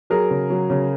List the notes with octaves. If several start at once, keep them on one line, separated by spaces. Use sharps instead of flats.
F#3 G#4 A#4
C#3
F#3
C#3